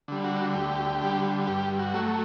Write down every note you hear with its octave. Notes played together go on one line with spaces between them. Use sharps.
D3 G3
F#4
D2 G4
D3 G3
G2 G4
F#4
F#3 A3